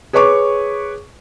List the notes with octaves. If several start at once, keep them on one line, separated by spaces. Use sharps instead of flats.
G#4 B4 C#5 C#6 D6